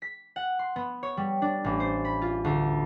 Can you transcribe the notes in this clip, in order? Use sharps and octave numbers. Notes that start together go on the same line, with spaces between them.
B6
F#5
C6
B3
C#5
G3
D4
A1
C5
B5
F4
D2